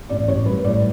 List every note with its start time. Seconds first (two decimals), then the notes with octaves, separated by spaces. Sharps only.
0.09 A1 D5
0.28 A1 C#5
0.46 G3 B4
0.64 A2 D5